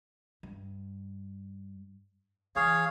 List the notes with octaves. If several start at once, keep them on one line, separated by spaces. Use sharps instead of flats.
G2
E3 G#4 C#5 F5